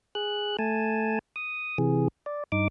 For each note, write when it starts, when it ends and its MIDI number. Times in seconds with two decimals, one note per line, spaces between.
0.15 0.57 68
0.15 0.57 90
0.59 1.19 57
0.59 1.19 80
0.59 1.19 81
1.36 1.78 87
1.78 2.08 48
1.78 2.08 52
1.78 2.08 68
2.26 2.44 74
2.52 2.68 43
2.52 2.68 63
2.52 2.68 86